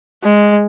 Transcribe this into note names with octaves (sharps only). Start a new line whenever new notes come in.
G#3